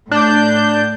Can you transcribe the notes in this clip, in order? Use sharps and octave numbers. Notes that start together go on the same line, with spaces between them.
A2 D4 G6